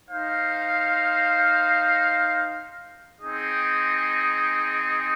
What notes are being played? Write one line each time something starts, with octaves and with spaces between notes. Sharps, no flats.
D#4 C5 F5
C4 D#4 G#4 D#5